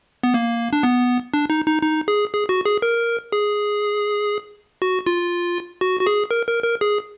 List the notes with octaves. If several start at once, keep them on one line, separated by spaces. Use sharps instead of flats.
B3
A#3
D4
B3
D4
D#4
D#4
D#4
G#4
G#4
F#4
G#4
A#4
G#4
F#4
F4
F#4
F#4
G#4
A#4
A#4
A#4
G#4